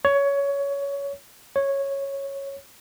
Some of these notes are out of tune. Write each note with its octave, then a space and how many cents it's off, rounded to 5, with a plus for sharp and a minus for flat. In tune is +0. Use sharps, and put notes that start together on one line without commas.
C#5 +15
C#5 -10